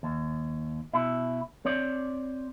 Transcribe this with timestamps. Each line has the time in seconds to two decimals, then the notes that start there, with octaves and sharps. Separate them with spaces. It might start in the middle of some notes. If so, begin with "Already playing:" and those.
0.03 D#2
0.93 B2 E4
1.65 C4 C#5 D5